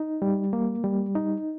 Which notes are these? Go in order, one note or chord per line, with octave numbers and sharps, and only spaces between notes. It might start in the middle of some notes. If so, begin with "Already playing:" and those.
Already playing: D#4
G3
A#3
G3
D#4